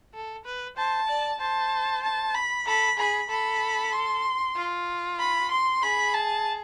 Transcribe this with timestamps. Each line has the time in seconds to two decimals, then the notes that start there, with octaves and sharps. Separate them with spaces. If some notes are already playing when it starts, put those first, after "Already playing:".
0.14 A4
0.45 B4
0.77 C5 A5
1.08 D5
1.40 C5 A5
2.03 A5
2.35 B5
2.67 A4 B5
2.98 G#4 B5
3.30 A4 B5
3.92 C6
4.56 F4
5.19 B5
5.51 C6
5.82 G#4 B5
6.14 A5